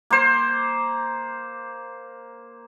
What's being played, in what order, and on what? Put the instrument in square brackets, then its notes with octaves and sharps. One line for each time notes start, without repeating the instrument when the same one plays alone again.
[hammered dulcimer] A#3 C5